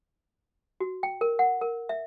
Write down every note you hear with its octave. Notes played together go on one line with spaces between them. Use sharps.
F#4
G5
A#4
F#5
A#4
E5